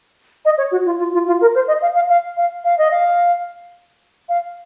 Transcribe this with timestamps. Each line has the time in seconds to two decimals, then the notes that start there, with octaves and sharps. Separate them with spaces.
0.45 D#5
0.58 C#5
0.71 F#4
0.85 F4
0.99 F4
1.13 F4
1.27 F4
1.41 A#4
1.55 C5
1.68 D#5
1.82 F5
1.95 F5
2.09 F5
2.37 F5
2.64 F5
2.78 D#5
2.91 F5
4.29 F5